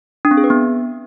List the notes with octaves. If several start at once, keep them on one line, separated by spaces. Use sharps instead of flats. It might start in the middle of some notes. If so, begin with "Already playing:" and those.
D4
C4
G#4
B4
B3